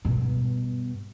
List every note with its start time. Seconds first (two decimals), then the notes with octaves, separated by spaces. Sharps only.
0.05 G2 B2